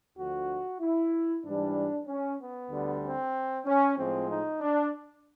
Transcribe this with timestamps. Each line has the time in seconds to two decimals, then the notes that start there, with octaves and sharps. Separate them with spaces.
0.17 D2 D3 F3 F#4
0.81 E4
1.44 G#2 E3 G3 D4
2.07 C#4
2.40 B3
2.70 D2 D3 G3
3.02 C4
3.66 C#4
3.97 A2 F3 G#3 C4
4.30 D#4
4.61 D4